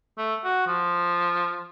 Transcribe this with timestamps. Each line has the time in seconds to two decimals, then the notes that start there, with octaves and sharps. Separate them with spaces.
0.18 A3
0.44 F#4
0.67 F3